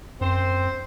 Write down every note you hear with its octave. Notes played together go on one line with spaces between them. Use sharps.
F#2 C4 C5